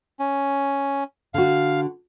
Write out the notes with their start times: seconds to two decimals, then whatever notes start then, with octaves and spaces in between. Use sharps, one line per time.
0.20 C#4
1.34 D3 F#4 F5